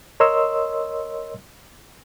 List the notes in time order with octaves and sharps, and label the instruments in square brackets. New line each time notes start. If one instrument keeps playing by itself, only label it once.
[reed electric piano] A#4 C#5 D#5 C6 E6